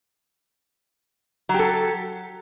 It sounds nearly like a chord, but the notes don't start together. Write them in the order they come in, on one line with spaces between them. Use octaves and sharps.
F#3 G4 A4